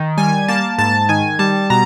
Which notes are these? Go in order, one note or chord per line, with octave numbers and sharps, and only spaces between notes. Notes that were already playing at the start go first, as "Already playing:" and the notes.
Already playing: D#3
G3 G#5
A#3 A5
G#2 A5
D#3 G#5
G3 A5
B2 A#5